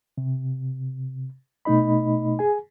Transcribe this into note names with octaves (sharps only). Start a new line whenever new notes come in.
C3
B2 A3 D#4 D#5 B5
G#4 G#5